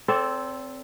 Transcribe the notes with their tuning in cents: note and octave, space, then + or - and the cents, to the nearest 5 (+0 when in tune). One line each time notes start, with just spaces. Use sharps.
C4 +0 A4 +0 D5 -45